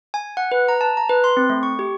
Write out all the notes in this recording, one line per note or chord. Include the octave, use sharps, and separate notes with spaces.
G#5
F#5
B4
A#5
A5
A#5
B4
C6
C4
A3
C#6
G4